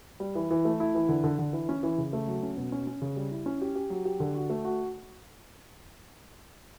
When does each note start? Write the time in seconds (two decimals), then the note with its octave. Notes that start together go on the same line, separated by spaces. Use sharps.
0.20 G3
0.35 E3
0.50 E3
0.65 A3
0.80 E4
0.95 E3
1.09 D3
1.24 D3
1.39 D3
1.53 E3
1.69 C#4
1.83 E3
1.98 C#3
2.13 A3
2.27 F#3
2.43 C#4
2.57 B2
2.72 C#4
2.87 C#4
3.02 C#3
3.16 G3
3.31 E4
3.46 C#4
3.61 G4
3.75 G4
3.90 F#3
4.05 G4
4.20 D3
4.35 F#4
4.50 A3
4.65 F#4